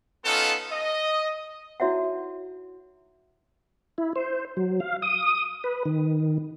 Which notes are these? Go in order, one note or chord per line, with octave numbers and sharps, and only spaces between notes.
B3 C#4 D#4 F4 A4
D#5
D#4 E4 F#4 C#5 E5 F#5
E4
C5
F#3
F5
D#6
B4
D#3